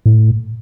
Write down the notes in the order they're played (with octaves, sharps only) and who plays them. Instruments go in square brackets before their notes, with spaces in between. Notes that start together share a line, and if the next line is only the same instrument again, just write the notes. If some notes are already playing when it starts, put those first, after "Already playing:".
[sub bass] A2